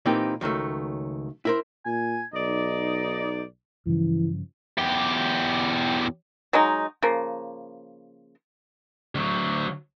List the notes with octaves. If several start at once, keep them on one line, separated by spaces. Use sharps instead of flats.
A#2 E3 A#3 C4 D#4 G4
C#2 D#3 F#3 A3
E4 A#4 C5
A#2 G#5
B1 D#4 D5 D#5
G2 C#3 E3 F3
E2 G4
F#3 G#3 D#4
C#3 F3 A#3
D2 F#3